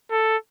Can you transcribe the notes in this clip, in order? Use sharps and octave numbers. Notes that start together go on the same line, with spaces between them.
A4